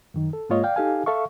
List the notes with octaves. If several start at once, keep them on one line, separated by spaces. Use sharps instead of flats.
F#2 D#3 D#4
A4
G#2 G#3 A#3 F4 C#5 D#5
D5 F5 G5
D#4 G4 A4 F5 G#5
A4 E5 F5 C#6